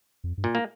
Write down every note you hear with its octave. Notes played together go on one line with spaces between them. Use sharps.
F2
G2
A#2
A#3